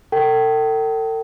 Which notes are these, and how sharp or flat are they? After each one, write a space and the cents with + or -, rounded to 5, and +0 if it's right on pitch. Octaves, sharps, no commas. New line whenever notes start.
A4 +40 G5 -30